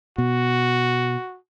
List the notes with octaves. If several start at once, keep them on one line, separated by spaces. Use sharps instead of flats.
B2 F#4